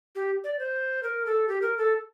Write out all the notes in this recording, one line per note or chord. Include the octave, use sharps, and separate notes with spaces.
G4
D5
C5
A#4
A4
G4
A#4
A4